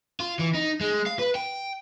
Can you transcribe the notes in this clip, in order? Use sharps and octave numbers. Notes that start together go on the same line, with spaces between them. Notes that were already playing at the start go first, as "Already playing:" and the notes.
F4
E3
D#4
G#3
F5
B4
G5